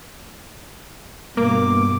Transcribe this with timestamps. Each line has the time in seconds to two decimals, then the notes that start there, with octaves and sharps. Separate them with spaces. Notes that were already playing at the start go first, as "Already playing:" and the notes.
1.37 G2 B2 A#3 D6